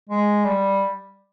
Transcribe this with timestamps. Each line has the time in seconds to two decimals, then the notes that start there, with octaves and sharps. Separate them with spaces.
0.09 G#3
0.45 G3